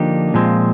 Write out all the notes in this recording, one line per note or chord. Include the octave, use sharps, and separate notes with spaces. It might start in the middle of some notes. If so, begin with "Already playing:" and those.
Already playing: D3 F3 A#3 D4 D#4 G4
A#2 F3 G#3 C4